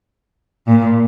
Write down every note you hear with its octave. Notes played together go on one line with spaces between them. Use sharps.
A#2